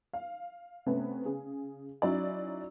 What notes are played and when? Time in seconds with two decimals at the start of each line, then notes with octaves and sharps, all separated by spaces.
0.13 F5
0.86 C3 A3 B3 C#4
1.25 C#3 G#4
2.02 F#3 C#4 D#4 E4 D5